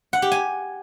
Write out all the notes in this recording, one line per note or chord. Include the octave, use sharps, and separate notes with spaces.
F#5
G4
G#5